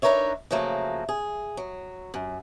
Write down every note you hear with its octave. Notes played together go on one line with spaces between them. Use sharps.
D4 D#4 A#4 B4 C#5 E5
C#3 F3 F#3 A3 A#3
G#4
F#3
F#2